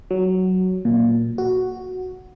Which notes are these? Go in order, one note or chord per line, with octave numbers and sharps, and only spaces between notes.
F#3
A#2
F#4